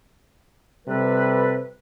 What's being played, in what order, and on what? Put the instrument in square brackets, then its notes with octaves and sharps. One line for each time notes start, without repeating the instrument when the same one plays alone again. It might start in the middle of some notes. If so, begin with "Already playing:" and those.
[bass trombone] C3 [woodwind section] G3 A4 B4